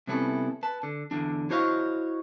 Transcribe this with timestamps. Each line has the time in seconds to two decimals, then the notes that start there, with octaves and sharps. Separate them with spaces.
0.07 C3 G3 B3 C#4 E4 A4
0.63 B4 A5
0.83 D3
1.11 E2 D3 F3 D4
1.50 E4 F#4 C5 C#5 D#5 F5